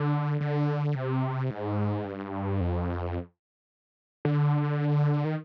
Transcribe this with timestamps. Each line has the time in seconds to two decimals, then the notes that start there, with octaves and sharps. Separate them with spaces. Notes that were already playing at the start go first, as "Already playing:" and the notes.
Already playing: D3
0.41 D3
0.95 C3
1.50 G#2
2.05 G2
2.61 F2
4.25 D3
5.25 D#3